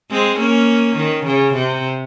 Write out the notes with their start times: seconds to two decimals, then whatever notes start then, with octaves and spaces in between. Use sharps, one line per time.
0.11 G#3 C4
0.40 A#3 C#4
0.97 D#3
1.26 C#3
1.55 C3